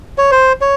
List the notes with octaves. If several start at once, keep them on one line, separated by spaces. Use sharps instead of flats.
C#5
C5
C#5